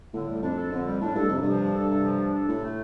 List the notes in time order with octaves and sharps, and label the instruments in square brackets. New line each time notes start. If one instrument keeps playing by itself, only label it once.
[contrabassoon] A2 [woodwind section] D3
[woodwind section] G3
[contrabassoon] F2 [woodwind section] D4
[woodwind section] A4
[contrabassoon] F2 [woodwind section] D3
[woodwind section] G3
[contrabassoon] A2 [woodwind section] D4
[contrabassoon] G2 [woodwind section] A4
[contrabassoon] F2 [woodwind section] C3
[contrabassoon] G2 [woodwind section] F3
[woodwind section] D4
A4
C3
F3
D4
A4
[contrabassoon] A2 [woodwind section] C3
[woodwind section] A3